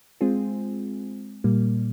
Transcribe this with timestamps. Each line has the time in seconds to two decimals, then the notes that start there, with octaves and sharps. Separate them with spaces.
0.21 G#3 C4 F4 G#4
1.44 A#2 G3 A#3